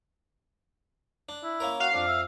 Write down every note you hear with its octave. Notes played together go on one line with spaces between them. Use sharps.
D4
E4
A#3 C#4 A#4
F#4 F5
F2 D4
E5